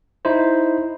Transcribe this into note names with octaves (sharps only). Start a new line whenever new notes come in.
D#4 E4 C5